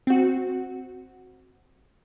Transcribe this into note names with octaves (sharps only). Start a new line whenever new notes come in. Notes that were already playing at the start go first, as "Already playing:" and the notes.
C4 F#4